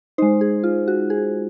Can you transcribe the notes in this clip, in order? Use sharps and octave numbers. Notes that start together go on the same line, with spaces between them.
G#3 D#4 C5
G#4
F4
F#4
G#4